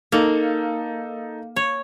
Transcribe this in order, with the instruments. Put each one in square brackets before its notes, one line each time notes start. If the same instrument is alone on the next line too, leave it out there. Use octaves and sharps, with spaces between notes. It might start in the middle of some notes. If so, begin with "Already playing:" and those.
[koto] A#3 [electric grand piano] D#4 A4
[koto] C#5